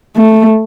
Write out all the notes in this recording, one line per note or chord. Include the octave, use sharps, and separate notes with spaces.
A3